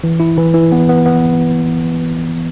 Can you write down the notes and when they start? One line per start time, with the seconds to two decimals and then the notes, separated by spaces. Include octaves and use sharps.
0.04 E3
0.20 E4
0.37 E3
0.54 E3
0.72 B3
0.89 B3
1.06 B3